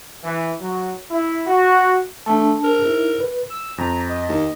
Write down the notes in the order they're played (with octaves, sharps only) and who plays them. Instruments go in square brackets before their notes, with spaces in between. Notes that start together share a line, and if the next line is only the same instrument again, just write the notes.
[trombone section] E3
F#3
E4
F#4
[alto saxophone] A3 [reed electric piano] D4 A5
[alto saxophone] A#4
[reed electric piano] D#4 E4
B4
[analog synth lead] E6
[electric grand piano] F2 [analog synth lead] A#5
[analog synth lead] D#5
[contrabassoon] D#2